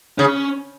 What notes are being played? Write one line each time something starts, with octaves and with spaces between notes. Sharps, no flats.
C#3 C#4